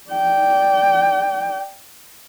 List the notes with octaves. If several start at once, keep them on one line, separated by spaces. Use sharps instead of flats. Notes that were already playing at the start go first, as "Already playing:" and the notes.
D5 G5